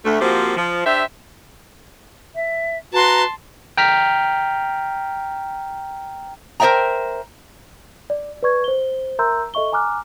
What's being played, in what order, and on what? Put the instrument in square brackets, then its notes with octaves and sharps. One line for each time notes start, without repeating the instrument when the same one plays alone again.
[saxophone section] D2 A3
F3 A#3 C4 F#4 G4
F3
D4 G4 C5 E5
[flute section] E5
[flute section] F#4 B4 A#5 [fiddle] A5 C6
[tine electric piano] G5 A#5 F6 B6
[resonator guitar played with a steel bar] A#4 C5 D#5 E5 G5 A#5
[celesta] D5
B4 D5 C#6 G#6
C5 G7
A#4 E5 A#5 C6 E6 G6
A4 D#5 E5 C#6 G7
G#5 A#5 D6 F6 F#6